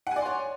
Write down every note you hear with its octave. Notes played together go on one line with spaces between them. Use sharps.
C#5 D5 F#5 G#5 C6